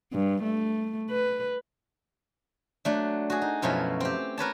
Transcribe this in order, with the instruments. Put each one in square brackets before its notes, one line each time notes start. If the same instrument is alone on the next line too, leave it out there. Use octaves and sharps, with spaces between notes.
[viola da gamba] G2
A3
B4
[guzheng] F#3 A3 D4
F#4 G#4
D#4
F#2 B2 F3 A3 E4 C#5
C4 G4
A#4 B4 C#5 A5